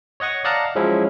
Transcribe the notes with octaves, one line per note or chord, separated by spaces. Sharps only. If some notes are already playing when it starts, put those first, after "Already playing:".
C#5 D#5 F#5 C#6 D#6
D5 D#5 F5 F#5 A5 A#5
F3 F#3 G#3 C#4 E4